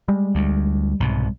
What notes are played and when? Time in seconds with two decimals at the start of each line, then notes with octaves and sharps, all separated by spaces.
0.08 G3 G#3
0.35 D2
1.00 C2 G#2 B2